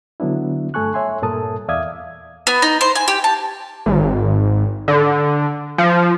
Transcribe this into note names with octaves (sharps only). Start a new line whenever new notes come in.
D3 F#3 B3 D4 E4
G2 A3 A4 G#5 C#6 F#6
C#5 E5 G#5 C6
G2 A#2 A4 A#4 A5 D#6
E2 D5 E5 F5 D#6 G#6
B3
D#4
C5
G#5
G4
A5
G#1
D3
F3